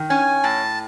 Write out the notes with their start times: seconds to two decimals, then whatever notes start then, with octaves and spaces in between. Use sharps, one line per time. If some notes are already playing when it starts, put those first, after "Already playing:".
Already playing: D#3
0.10 C#4 G#5
0.44 A2 A5